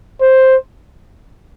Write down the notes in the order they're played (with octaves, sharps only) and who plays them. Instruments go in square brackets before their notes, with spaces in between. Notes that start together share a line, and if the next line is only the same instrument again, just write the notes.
[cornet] C5